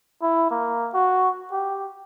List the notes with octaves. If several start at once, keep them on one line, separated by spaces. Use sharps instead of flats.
E4
A#3
F#4
G4